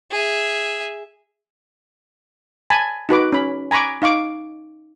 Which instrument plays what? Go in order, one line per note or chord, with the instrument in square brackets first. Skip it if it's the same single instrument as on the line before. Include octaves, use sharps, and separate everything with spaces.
[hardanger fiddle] G#4 E5
[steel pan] G#5 A5 B5
D#4 F#4 B4 D6
C#4 B5
G#5 A#5 B5 C#6 D6
D#4 F5 C#6 D6